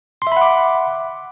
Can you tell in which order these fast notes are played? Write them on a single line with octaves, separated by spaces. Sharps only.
C6 E5 B5 F#5 D6